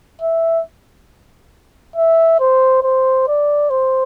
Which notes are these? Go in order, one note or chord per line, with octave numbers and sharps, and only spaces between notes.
E5
E5
C5
C5
D5
C5